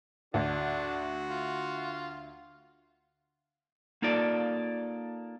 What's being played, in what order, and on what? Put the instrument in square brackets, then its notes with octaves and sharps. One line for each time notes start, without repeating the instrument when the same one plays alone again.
[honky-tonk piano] D2 [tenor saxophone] D4 [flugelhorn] F#4
[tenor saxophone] F4
[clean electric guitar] A#3 D#4 F4 A4 D5